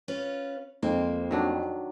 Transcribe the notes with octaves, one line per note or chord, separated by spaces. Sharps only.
C#4 F4 B4
F2 G#3 A#3 C4
D#3 F#3 D4